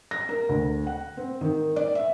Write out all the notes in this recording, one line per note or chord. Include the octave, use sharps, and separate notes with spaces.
A#6
A#4
D2
F#5
C4
D#3
D5
E5